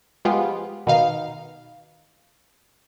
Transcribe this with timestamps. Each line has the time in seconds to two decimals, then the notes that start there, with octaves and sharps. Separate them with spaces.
0.25 F3 G#3 B3 F4 G4
0.87 B2 D#3 D#4 F5